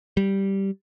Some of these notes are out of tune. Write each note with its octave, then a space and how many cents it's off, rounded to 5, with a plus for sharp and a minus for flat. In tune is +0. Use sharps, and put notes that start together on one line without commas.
G3 -5